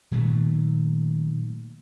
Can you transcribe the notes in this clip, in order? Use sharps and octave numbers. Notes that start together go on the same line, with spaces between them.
A#2 D#3 F#3 A3